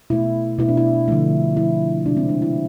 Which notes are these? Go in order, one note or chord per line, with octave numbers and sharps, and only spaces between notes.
B2 A3 E4
B2 A3 E4
D4
E4
D3 F3 A3
D3 F3 A3 E4
C3 G#3 D4
C4
D4
E4